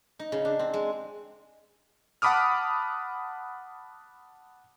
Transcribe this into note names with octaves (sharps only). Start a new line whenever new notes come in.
D#4
C#3
D4
C4
G#3
F#5 A5 B5 D6 D#6 F6